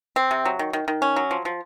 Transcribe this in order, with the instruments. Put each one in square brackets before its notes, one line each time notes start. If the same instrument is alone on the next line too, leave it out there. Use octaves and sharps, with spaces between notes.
[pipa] C4
C3
F#3
D#3
D#3
D#3
C#4
F#3
F3
F3